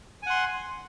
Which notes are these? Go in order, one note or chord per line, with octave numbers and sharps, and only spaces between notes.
F#5 G#5 C6